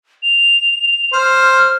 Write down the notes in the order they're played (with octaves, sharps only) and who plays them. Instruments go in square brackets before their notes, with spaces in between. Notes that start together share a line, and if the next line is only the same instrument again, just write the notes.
[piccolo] F7
[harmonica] C5 [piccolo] F6